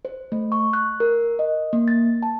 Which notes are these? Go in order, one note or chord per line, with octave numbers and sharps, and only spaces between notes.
C5
A3
C#6
F#6
A#4
D#5
A#3
A6
A5